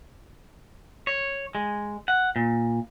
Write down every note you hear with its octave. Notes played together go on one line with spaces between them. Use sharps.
C#5
G#3
F#5
A#2